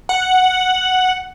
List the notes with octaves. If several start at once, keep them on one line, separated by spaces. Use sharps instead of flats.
F#5